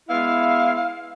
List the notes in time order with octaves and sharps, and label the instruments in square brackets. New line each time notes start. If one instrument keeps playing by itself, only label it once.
[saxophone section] G#3 B3 E4 [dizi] F5